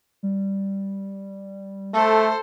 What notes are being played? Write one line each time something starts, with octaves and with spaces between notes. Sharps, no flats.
G3
A3 A4 C5